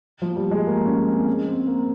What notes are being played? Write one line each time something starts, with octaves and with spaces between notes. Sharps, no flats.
F3
G3
G#3
A#3
C#4
C4
C4
A#3